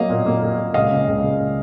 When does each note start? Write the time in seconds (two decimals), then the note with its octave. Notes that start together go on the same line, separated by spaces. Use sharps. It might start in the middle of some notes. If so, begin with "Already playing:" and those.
Already playing: F#3 A#3 D#5 F5
0.09 A#2
0.26 A#3
0.42 A#3
0.58 A#2
0.74 C#2 D#5 F5
0.91 C#3
1.08 C#2
1.23 C#2